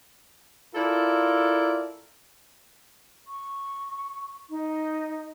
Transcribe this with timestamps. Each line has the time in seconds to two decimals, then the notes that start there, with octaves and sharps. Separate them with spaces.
0.74 E4 F4 A4 A#4 D5
3.26 C#6
4.50 D#4